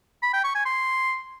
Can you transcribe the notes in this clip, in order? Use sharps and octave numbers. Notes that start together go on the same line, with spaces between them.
B5
G5
C#6
G#5
C6